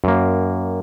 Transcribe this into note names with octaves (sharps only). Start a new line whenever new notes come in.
F#2 A#3